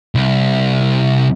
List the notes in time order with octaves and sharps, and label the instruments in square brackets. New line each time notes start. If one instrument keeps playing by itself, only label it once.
[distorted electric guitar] C2